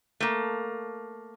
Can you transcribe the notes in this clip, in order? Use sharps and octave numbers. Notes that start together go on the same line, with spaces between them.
A3 A#3